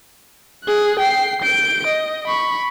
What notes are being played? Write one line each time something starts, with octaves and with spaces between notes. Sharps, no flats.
G#4 F#6
G5 C7
G6 D7
D#5
B5 C#6